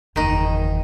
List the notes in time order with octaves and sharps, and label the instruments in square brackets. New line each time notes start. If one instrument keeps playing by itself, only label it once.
[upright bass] F#1 E2 [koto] D#3 D#4